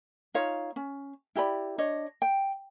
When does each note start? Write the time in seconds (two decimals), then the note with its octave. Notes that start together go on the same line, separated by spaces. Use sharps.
0.34 D#4 F4 C#5 F5
0.76 C#4
1.35 E4 G4 D5 B5
1.78 D4 C#5 D#5
2.22 G5